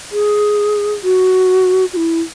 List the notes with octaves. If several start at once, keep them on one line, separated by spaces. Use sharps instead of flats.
G#4
F#4
F#4
E4